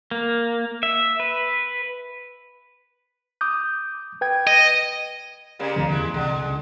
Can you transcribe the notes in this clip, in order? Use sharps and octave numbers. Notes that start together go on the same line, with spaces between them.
A#3
E5
B4
D6 D#6 G6
B4 G5 G#6
D#5
C#3 G3 A#3
D2 D3 F3
F1 E2 G#3 E4
C2 D3 G#3
C#2